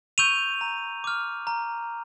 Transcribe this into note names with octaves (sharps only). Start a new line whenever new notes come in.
C#6 E6 G6 D#7 F7
A#5
D6 F6
A#5